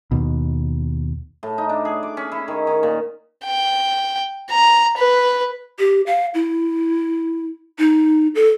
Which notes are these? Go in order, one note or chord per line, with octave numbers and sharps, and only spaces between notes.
D#2 B2
A2
D#4
D4
G#4
D6
C#4
E4
D#3
D#3
A#2
G5
A#5
B4
G4
F5
E4
D#4
A4